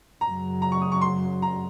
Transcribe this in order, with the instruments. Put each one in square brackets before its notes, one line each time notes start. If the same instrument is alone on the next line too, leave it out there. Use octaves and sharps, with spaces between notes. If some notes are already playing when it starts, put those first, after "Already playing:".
[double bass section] F#2 C#3 F#3 [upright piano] A#5
[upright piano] A#5
C#6
D#6
C#6
C6
A#5